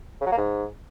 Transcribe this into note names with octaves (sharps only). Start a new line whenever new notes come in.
C#3
F#3
A#3
G#2